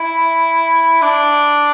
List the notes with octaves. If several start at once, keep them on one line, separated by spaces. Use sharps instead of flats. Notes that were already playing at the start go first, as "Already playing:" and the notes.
Already playing: E4
D4